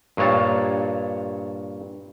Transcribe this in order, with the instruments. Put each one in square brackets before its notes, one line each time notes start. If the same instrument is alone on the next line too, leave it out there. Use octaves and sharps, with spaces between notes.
[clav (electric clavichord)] G2 A#2 C#5 A5